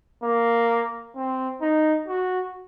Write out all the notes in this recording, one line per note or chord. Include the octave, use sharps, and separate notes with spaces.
A#3
C4
D#4
F#4